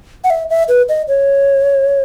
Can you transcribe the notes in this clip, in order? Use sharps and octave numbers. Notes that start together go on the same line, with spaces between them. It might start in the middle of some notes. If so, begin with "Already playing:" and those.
F#5
E5
E5
B4
D#5
C#5